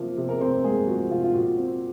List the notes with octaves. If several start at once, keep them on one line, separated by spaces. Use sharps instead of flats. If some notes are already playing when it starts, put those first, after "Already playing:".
Already playing: C3 F3 A#3
C3
A#4
C3 C4 C5
G#3 A#3 G#4
F3 F#4
C3 F4
F4
A#2 F#4
C4